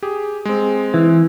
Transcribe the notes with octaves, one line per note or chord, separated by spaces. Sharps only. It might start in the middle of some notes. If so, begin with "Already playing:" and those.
G4 G#4
G#3 C4
E3